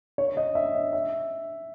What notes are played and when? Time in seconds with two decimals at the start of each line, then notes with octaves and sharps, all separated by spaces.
0.18 C#5
0.37 D#5
0.55 E5
0.75 D#5
0.93 E5